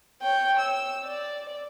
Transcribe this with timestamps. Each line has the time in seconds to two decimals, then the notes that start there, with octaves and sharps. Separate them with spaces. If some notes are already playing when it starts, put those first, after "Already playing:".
0.21 C#5 G5
0.60 E6
1.05 D5